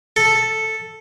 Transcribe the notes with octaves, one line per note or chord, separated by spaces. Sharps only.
A4